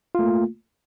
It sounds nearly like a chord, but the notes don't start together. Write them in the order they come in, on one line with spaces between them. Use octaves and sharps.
F4 A3 A#3